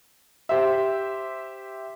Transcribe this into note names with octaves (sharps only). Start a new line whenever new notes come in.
G4 C5 E5